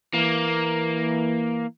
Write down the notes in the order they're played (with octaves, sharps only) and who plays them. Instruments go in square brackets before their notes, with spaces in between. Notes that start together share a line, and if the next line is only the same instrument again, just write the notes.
[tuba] E3 [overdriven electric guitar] A#3